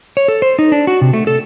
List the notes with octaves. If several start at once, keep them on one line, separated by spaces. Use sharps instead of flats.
C#5
A4
C5
D#4
D4
F#4
C3
A3
A4